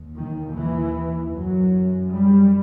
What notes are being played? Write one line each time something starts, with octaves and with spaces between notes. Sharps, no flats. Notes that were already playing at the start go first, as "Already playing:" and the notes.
Already playing: D#2
D#3
E3
F#2 F#3
G3